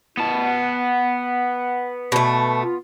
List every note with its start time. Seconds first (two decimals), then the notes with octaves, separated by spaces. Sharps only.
0.17 B3 E4 A5
0.43 F#5
2.12 B2 A3
2.62 F4